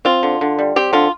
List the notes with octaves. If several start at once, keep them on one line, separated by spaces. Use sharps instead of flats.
C4 F4
D3
D3
G3
C4 G4
D3 F4